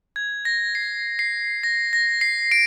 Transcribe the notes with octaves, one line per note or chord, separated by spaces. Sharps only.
G#6
A#6
C7
C7
A#6
A#6
C7
D7